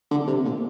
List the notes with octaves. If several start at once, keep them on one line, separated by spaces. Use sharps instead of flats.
D3
C3
A#2